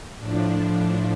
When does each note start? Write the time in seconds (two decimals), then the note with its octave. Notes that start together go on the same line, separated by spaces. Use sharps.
0.18 A2 F3 D4
0.57 D4